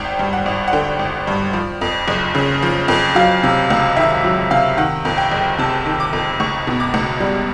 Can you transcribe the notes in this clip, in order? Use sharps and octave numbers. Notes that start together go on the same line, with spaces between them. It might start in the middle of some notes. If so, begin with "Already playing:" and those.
Already playing: G#1 G5
G2
F#5
G#1
F#5
D3 G5
G#1
G2
F3
F2
F#1
C#3
F3
F2
F#3 F5
C3
C#2
D#3 E5
F#3
C3 F5
D#3 F#5
F2
G5
F#1
C3 A5
D#3
D6
F2
C#2 C#6
B2
D6
C#2
G3